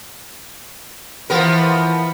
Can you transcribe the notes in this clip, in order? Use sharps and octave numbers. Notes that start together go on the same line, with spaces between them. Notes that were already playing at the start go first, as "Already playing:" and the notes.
E3 F3 B3 A#4